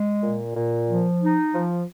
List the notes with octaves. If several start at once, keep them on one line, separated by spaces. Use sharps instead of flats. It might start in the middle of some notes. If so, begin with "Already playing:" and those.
Already playing: G#3
A#2
A#2
F3
D#4
F3